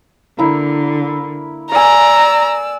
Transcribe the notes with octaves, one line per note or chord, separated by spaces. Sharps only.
D3 A#3 E4
D5 F5 G#5 A#5 E6